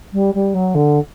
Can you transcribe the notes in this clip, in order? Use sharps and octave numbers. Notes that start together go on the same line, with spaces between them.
G3
G3
F#3
D3